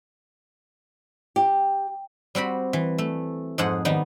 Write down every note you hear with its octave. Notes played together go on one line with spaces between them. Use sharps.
G4
G3 C4 F#4 B5
E3
A3
F2 G#2 G#4 F#5 C6
D#3 G3 B3 D#4